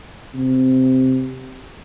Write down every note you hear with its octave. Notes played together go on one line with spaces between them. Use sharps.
C3